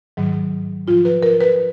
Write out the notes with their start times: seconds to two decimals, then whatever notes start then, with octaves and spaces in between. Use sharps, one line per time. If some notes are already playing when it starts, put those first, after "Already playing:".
0.17 G#2 D#3 F#3
0.87 G#2 F4
0.90 F3
1.05 B4
1.23 A#4
1.41 B4